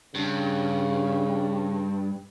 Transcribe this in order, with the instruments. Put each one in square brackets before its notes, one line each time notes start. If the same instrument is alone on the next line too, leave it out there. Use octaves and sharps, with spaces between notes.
[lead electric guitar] G2 [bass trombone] C#3